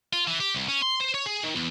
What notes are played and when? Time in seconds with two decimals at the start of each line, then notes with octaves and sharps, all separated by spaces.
0.13 F4
0.27 E3
0.40 G4
0.55 C2
0.68 C#4
0.82 C6
1.00 C5
1.14 C#5
1.26 G#4
1.44 D#3
1.55 E2